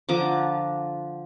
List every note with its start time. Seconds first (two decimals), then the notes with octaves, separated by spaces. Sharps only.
0.09 D3 F3 A#5 D6